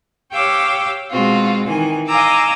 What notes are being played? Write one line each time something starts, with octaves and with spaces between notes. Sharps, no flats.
G4 C#5 F5 G5 D6 E6
B2 G#3 C4 F4 F#4
D#3 E3 G#5
D#5 F5 G#5 A#5 D6 E6